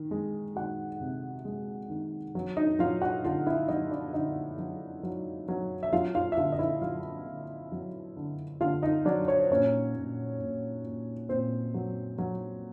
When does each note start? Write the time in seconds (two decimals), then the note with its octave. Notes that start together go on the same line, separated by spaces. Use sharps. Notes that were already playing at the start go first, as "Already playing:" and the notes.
Already playing: D#3
0.11 G#3
0.56 D#3 F#4 F#5
1.01 C3
1.45 G#3
1.90 D#3
2.35 F#3
2.57 D#4 D#5
2.79 F#3 F4 F5
3.01 F#4 F#5
3.24 D3 F4 F5
3.47 E4 E5
3.68 F#3 D#4 D#5
3.91 D4 D5
4.13 D3 D#4 D#5
4.58 F#3
5.03 F#3
5.48 F#3
5.83 E5
5.93 F#3 F4 F5
6.15 F4 F5
6.32 E5
6.37 D3 F4 F5
6.52 D#5
6.59 E4 E5
6.82 F#3 F4 F5
7.26 D3
7.72 F#3
8.16 D3
8.61 D3 F4 F5
8.83 D#4 D#5
9.05 F#3 D4 D5
9.28 C#5
9.39 C5
9.51 A#2 C#4 C#5
9.95 A#2
10.40 A#2
10.84 A#2
11.29 A#2 C4 C5
11.74 F#3
12.18 F#3